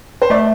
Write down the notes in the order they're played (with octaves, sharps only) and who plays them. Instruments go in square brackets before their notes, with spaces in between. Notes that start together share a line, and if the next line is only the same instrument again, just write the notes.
[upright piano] C5
[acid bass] A3 [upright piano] D5